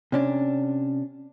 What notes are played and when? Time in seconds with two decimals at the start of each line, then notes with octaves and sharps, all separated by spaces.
0.12 C3 C#4 D4